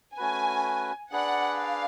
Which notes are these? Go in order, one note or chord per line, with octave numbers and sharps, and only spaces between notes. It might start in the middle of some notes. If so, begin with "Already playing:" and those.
A3 C#4 F#4 B4 G#5
D4 G#4 B4 D5 F#5
F5